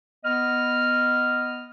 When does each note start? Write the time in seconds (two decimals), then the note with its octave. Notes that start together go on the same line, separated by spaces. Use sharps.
0.25 B3 D#5 F6